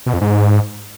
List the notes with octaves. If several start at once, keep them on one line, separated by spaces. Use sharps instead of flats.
B2
F2
G#2